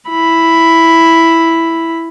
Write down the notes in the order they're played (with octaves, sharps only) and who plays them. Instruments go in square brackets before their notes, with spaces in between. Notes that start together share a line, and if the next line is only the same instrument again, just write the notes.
[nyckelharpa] E4 B5